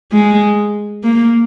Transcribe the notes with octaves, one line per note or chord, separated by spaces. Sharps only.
G#3
A#3